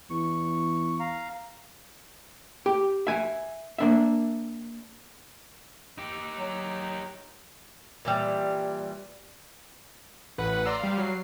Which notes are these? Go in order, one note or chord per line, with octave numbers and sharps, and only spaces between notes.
E2 C#6
F5 A#5
G4
E5 G#5
A#3 D4 E5
D#4 G4
F#3
A#2 E3 G3
A1 B4 F#5
D5 A#5 C6 E6
G3 F5
F#3 C7